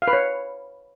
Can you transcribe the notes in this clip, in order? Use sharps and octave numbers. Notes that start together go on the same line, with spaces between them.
F5
B4
C#5